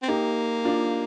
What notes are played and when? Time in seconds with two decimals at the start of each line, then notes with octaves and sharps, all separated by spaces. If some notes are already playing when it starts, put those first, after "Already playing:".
0.03 C4
0.08 A#3 D#4 G4
0.65 D4 F4